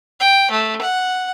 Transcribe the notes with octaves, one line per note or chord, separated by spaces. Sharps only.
G5
A3
F#5